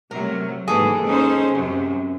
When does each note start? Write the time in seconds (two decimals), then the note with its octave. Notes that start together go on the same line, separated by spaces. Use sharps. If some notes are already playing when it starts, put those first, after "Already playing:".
0.11 C3 F#3 A3 A#4
0.68 D#2 G#2 E3 G#4 A4
1.07 C#4 D#4 C5
1.52 F#2 C3 F#3